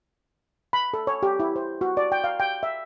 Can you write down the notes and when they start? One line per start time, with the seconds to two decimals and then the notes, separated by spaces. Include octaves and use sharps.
0.73 B5
0.94 A4
1.07 C#5
1.23 G4
1.40 E4
1.56 C5
1.81 F#4
1.97 D5
2.12 G5
2.24 F5
2.40 G5
2.63 E5